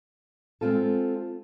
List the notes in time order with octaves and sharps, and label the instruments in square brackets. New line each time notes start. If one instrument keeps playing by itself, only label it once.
[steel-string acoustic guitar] G#3 C4 F4 A4